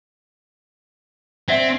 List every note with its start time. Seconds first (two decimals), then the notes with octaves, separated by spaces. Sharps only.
1.48 C4 D5 E5 F#5